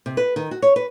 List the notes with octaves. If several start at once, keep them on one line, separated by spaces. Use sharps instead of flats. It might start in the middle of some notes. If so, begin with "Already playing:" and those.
C3
B4
D#3
F#4
C#5
B4